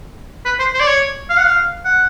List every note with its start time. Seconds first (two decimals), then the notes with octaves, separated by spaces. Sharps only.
0.45 B4
0.59 C5
0.74 C5
0.80 D5
0.88 C#5
1.29 F5
1.37 F#5
1.44 F5
1.85 F#5